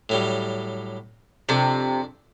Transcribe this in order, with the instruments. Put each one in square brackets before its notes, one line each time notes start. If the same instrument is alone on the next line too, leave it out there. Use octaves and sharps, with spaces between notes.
[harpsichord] A2 F#3 G3
[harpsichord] F2 D4 [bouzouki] C3